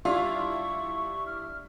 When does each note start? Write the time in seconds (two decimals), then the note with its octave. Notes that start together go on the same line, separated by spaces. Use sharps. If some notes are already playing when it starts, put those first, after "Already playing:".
0.05 G3 D4 E4 F4 C#6
1.27 F6